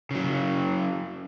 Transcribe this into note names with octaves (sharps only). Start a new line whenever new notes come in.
C#3 F#3